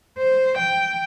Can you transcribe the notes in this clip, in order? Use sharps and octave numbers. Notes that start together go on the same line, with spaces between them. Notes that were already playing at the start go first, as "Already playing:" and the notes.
C5
G5